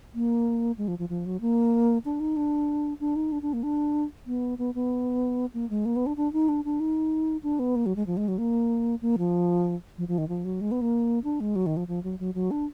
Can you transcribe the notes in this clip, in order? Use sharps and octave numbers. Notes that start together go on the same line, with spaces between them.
A#3
G#3
F3
F3
F3
F#3
A#3
D4
D#4
D4
D4
D#4
D4
D4
A#3
D4
B3
B3
B3
A#3
G#3
A#3
B3
D4
D4
D#4
D4
D4
D#4
D4
B3
A#3
F#3
G#3
F3
G#3
F#3
A#3
A#3
F3
F3
F3
D#3
F3
F#3
G#3
B3
A#3
D4
G#3
F#3
D#3
F3
F3
F#3
F#3
F#3
D4